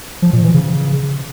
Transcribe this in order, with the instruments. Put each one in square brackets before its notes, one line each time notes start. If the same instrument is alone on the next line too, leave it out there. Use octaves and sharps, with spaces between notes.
[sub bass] F3
A#2
E3
C#3